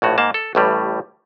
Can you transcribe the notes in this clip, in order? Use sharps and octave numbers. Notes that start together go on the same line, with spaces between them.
A#1 A2 F#4
G#2 A#3 A5
A4
A1 A2 G3